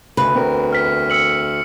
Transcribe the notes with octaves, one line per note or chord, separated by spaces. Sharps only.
D2 C#3 G#3 B4
E2 C4 A#4
F6 B6
E6 C#7 F#7